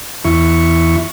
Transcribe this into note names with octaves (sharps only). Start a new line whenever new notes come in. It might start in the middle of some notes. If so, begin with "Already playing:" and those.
E2 E4 C#6